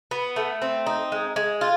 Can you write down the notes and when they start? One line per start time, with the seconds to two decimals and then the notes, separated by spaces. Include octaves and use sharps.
0.11 B3
0.36 A3
0.62 C4
0.87 D#4
1.12 G#3
1.36 G#3
1.61 F4